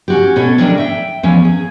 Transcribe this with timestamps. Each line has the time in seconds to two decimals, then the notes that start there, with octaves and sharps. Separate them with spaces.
0.08 C#4 F#4 G4
0.36 B2 C#4 A4 C#5
0.58 D3 D#3 F#3 G3 D4 A#4
0.77 E5 G5
1.23 E2 F3 C#4
1.44 G#4